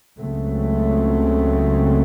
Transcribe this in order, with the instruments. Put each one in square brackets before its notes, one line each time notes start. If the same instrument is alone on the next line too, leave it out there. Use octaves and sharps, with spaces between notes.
[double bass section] C#2 C#3 F#3 A3 C4